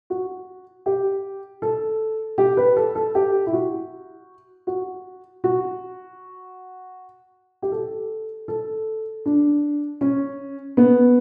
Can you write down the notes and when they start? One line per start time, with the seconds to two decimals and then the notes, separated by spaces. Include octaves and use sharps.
0.10 F#4
0.86 G4
1.62 A4
2.38 G4
2.57 B4
2.76 A4
2.95 A4
3.15 G4
3.46 E4
3.53 F#4
4.67 F#4
5.44 F#4
7.62 G4
7.72 A4
8.48 A4
9.26 D4
10.01 C#4
10.77 B3